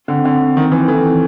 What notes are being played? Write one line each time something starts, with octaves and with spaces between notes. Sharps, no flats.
D3 C4
D3 C4
C4
D#3 C4
E3 C4
E3 A4
C4